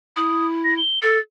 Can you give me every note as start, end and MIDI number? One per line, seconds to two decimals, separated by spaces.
0.17 0.79 64
0.17 0.47 87
0.64 0.74 94
0.78 0.99 103
1.02 1.18 69
1.02 1.20 93